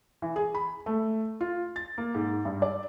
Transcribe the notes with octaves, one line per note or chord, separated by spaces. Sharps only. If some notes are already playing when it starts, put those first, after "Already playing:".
E3
G#4
B5
A3
F4
A6
A#3
G#2
G2
D5